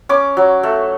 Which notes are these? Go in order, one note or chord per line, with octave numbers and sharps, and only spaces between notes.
C#4 D6
F#3
A3